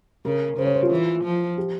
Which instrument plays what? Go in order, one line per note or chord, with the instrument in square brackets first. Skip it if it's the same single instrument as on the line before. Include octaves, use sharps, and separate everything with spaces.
[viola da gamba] C#3 [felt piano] A#4
[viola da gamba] C#3 [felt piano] C5
[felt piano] C#5
C5
F4
[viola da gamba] E3
F3
[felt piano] G4